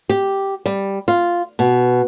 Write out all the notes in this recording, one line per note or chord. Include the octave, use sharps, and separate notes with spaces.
G4
G3
F4
B2